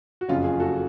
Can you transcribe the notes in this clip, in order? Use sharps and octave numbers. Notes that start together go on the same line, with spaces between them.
F#4
F#1 F2 C#3 C#4 F4
F4 G#4
F#4 A4